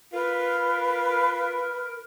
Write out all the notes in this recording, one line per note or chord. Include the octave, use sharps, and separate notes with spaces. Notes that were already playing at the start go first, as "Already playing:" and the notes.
F4 A#4 B4